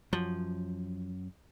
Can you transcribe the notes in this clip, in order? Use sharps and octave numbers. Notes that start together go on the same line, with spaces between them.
F#2 F3